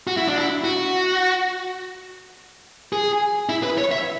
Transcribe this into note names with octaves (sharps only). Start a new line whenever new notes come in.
F#4
E4
D4
E4
F#4
G#4
E4
B4
C#5
E5